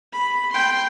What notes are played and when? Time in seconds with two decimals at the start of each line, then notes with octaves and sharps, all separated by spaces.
0.13 B5
0.52 G5 C6